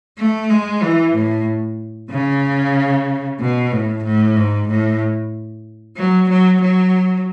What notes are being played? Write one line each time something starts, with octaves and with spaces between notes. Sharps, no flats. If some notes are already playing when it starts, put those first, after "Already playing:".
A3
G#3
E3
A2
C#3
B2
A2
A2
G#2
A2
F#3
F#3
F#3